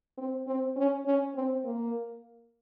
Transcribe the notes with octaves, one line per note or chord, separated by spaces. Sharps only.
C4
C4
C#4
C#4
C4
A#3